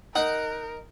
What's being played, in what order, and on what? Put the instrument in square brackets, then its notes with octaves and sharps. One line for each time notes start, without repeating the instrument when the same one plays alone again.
[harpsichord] D#4 [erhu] A#4 [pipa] F#5